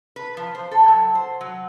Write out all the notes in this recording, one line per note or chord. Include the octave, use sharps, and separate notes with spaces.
B4
F3
C5
A4
F#3
C5
F#3